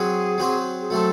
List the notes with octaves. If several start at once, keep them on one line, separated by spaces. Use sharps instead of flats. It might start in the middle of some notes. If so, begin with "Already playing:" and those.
Already playing: F#3 C4 F#4 G#4 C5
F#3 C4 F#4 C5
G#4
F#3 A3 C4 A4